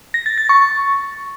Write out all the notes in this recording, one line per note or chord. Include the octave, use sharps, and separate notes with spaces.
A#6
A6
A6
C#6